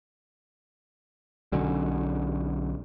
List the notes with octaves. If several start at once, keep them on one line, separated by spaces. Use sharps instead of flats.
B1 D3 F#3 C#4